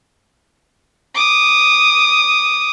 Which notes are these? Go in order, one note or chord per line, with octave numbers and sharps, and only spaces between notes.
D6 D#6